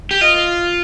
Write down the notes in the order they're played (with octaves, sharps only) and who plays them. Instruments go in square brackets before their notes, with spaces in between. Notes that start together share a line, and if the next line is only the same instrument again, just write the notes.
[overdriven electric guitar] G4
[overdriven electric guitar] F4 [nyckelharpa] D#5